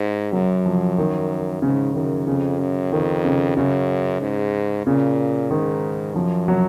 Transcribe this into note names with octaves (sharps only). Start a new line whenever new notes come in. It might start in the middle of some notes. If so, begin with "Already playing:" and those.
Already playing: G#2
F#2 F#3
F3
D#3
G#2 C#3
F#2 D#3
F2 C#3
F#2
F2 D#3
C#3
F#2 C#3
G#2
A#2 C#3
G#2 D#3
F#2 F3
F#3